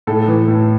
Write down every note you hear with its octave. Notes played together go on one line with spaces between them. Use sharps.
A2 A4
E3
A2